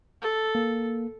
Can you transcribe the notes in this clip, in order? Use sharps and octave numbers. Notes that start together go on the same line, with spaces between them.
A4
A#3